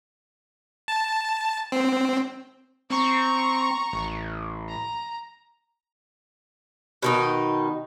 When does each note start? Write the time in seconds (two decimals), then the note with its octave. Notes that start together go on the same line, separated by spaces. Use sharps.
0.88 A5
1.72 C4
2.90 C4 A#5 C#6
3.93 A1
4.69 A#5
7.02 B2 D#3 D#4